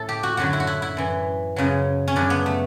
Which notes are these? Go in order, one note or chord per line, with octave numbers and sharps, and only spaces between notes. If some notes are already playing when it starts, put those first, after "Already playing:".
Already playing: A2 A4
G4
F#4
F#2 D3 F#3 F#4
E4
F#4
E4
E4
F#2 E3
F#2 C#3 F#3
C#4
F#2 C#3 F#3 D4
B3
A3